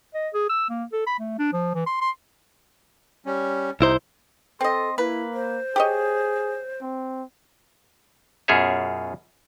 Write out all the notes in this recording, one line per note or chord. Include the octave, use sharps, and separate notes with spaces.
D#5
G#4
E6
A#3
A4
B5
A3
D4
F3
E3
C6
C6
G3 C#4
C2 C3 D#4 E4 C5
C4 A4 D#5 C6
A#3 E4 B4
C5
G4 G#4 C#5 D#5
C4
F#2 B2 F4 G#4 C#5 E5